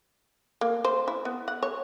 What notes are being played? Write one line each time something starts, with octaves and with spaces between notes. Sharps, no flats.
A#3
C5
E4
B3
F#5
C#5